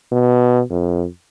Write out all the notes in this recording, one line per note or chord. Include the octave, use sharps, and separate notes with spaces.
B2
F2